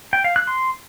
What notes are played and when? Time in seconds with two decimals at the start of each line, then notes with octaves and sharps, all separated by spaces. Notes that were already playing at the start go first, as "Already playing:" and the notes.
0.13 G5
0.24 F5
0.36 F#6
0.47 C6